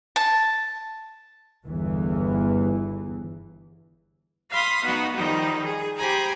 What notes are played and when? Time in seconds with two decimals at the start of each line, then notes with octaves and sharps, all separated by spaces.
0.16 A5
1.65 G1 E2 E3
4.52 F5 B5 C6 D#6
4.84 B3 D#4 F#4
5.17 D#3 F3 G3 D#4
5.64 G#4
5.98 G4 C5 G#5 A#5 B5